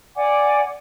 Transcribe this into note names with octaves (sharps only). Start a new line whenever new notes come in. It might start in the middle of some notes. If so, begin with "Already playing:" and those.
D5 F#5 G#5 D6